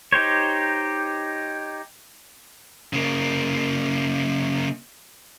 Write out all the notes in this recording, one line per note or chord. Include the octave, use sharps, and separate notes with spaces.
D#4 G4 C5 C#5
C#3 A#3